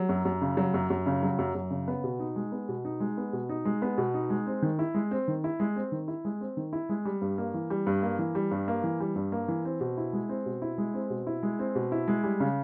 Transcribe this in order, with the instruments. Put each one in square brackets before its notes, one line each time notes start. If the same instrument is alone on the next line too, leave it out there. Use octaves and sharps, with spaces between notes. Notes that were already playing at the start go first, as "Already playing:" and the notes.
Already playing: [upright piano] F#3
F#2
F#2
C#3
F#3
F#2
F#2
C#3
F#3
F#2
F#2
C#3
B3
B2
D#4
G#3
B3
B2
D#4
G#3
B3
B2
D#4
G#3
B3
B2
D#4
G#3
C4
D#3
E4
G#3
C4
D#3
E4
G#3
C4
D#3
E4
G#3
C4
D#3
E4
G#3
G3
G2
A#3
E3
G3
G2
A#3
E3
G3
G2
A#3
E3
G3
G2
A#3
E3
C4
B2
E4
G#3
C4
B2
E4
G#3
C4
B2
E4
G#3
C4
B2
E4
G#3
G3
C#3